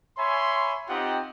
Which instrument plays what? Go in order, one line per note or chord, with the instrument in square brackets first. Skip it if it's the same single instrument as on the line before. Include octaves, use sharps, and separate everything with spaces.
[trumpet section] C#5 E5 G#5 B5 C6
C4 D#4 F4 G4 D#5 F#5